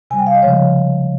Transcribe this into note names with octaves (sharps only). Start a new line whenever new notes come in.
C3 G3 G#5
G5
F5
D#5
C#3 F3 G#3 C#5